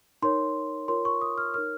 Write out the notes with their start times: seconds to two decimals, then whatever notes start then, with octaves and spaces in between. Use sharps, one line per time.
0.22 D#4 A#4 C#5 C6
0.88 F4 A#4 C#5 C6
1.05 C#6
1.21 D#6
1.38 F6
1.54 D#4 A#4 C#5 F6